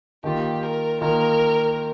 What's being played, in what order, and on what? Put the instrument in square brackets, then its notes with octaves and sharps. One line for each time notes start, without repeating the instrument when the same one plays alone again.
[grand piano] D#3 A#3 F4 [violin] G4
[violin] A#4
[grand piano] D#3 A#3 F4 [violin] A#4